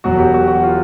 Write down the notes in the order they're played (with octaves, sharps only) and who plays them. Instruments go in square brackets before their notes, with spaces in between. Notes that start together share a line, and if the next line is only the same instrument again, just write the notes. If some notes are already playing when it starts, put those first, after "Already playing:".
[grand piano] E1 E2 B2 F#3 F#4
G4
F#4
F#4
F4